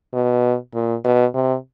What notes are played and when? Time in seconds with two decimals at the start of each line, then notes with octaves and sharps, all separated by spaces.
0.14 B2
0.74 A#2
1.04 B2
1.34 C3